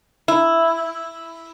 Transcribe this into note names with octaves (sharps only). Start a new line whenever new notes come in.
E4